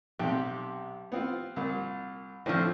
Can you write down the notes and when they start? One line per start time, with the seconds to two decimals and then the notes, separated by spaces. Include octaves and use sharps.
0.19 B1 C3 G4
1.12 B3 C4 F4
1.56 C2 A#2
2.46 A2 F3 A3 C4 D4